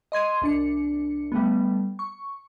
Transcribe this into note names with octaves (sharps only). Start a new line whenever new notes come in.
D#5 C6 G#6 D#7
C2 D4 C#7
G3 A3 B3
C#6